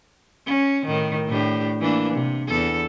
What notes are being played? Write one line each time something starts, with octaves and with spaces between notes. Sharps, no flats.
C#4
A2 D#3
A2 D4 G4
E3 A#3 D4
C3
E2 A4